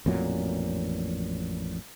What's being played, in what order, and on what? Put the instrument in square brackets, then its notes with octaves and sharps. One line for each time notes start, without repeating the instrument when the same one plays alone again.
[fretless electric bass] A1 F2 A#2 F#3